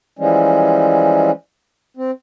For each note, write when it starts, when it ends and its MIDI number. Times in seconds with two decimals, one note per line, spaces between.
0.19 1.31 52
0.19 1.31 53
0.19 1.31 55
0.19 1.31 56
0.19 1.31 61
1.97 2.11 60